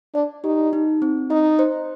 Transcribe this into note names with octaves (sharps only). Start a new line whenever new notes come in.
D4 D5
D#4 G4
D#4
C4
D#4 D#5
C5